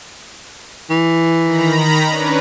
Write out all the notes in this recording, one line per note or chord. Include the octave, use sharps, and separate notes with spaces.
E3
D#3 A#5 B5
C#4 D4 B4